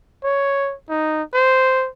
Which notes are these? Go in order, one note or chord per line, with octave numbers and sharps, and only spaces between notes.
C#5
D#4
C5